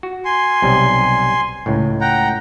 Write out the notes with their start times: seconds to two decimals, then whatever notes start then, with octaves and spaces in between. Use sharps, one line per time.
0.03 F#4
0.25 G#5 C6
0.62 B1 C3 G3
1.66 C#2 A2
2.01 F#5 G5 A#5